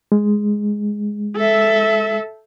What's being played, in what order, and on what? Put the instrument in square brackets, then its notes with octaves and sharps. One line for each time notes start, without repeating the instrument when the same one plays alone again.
[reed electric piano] G#3
[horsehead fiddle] A4 E5